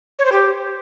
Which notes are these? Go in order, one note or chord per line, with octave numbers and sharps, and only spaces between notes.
C#5
C5
G4